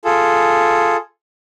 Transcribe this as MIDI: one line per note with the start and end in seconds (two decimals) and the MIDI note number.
0.05 0.97 65
0.05 0.97 68
0.05 0.97 69